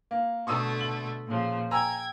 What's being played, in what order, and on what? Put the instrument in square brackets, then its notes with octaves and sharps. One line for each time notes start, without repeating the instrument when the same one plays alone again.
[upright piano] A#3
[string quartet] B2 D3 A3 [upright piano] C#6 D#6 E6
[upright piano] F#7
[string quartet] A#2 C#3 F3
[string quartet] G5 G#6 [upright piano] G#5 A#5 E6